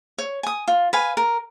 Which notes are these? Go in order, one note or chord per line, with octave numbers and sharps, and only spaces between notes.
C#5
G#5 D#6
F4
B4 F5 G#5
A#4